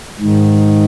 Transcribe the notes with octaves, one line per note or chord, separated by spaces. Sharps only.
G#2 D#3